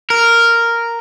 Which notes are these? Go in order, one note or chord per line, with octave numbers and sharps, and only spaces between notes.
A#4